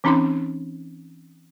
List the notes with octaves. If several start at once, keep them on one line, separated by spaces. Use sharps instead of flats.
E3 C4 C#4 D#4 C6 D6